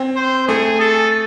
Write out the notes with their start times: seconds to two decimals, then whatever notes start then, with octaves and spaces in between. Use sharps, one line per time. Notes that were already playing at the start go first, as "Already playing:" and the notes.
Already playing: C4
0.16 C5
0.48 A3 G#4
0.80 A4